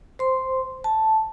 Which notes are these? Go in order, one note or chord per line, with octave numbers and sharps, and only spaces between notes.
C5 C6
A5